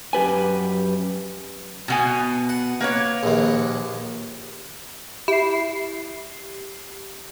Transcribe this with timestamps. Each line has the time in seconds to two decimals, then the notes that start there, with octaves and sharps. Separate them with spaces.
0.13 F#2 G4 B4 G#5
1.88 B2 B3 G#5
2.49 F#5
2.80 A#3 B4 C#5
3.23 A#1 D#2
5.28 E4 G4 C7